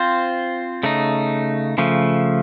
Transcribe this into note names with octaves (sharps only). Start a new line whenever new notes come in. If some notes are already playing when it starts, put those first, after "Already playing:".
Already playing: C4 F4 C5
C#3 A3 D#4
C#3 F3 A3